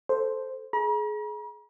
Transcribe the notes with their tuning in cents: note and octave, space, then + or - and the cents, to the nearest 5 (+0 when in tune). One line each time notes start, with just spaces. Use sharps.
A4 +0 C5 +0
G#4 +25 A#5 +45